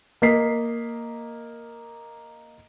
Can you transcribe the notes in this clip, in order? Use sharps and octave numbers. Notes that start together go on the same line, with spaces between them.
A#3 D#5 B6 C7